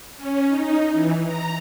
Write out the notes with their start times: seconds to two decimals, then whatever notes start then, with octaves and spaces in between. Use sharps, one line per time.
0.17 C#4
0.48 D#4
0.92 E3
1.24 A#5